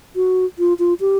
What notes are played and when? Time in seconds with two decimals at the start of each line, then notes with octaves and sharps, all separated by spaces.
0.16 F#4
0.59 F4
0.79 F4
1.00 G4